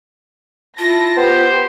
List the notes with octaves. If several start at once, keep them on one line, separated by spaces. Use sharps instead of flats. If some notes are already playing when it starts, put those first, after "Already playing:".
E4 F4 A5 A#6
B3 G4 C5